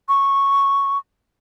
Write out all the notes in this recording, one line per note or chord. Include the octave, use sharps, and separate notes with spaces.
C#6